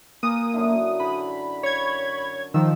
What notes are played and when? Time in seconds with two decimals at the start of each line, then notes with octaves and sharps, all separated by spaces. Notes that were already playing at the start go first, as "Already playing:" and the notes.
0.23 A#3 B4 G#5 A#5 D#6
0.54 F#2 D3 E4
1.00 D3 B5
1.63 C#5 G#6
2.54 D#3 F3 E6